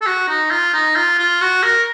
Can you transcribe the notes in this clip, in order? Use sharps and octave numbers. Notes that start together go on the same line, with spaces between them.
A4
F#4
D#4
F4
D#4
F4
F4
F#4
A#4